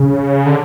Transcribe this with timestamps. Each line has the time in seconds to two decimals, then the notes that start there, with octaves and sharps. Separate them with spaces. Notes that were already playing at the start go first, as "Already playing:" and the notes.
Already playing: C#3
0.46 D3